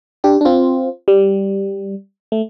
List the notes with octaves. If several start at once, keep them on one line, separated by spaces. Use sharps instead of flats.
D4 G4
D4
C4 F4
G3
A3